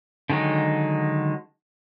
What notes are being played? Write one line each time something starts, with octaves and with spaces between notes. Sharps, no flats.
D3 D#3 F#3 G#3 D#4